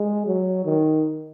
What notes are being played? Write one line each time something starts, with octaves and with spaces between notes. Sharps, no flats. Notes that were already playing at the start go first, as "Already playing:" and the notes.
Already playing: G#3
F#3
D#3